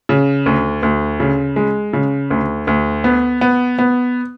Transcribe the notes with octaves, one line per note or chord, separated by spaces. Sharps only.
C#3
D2
D2
C#3
G#3
C#3
D2
D2
B3
B3
B3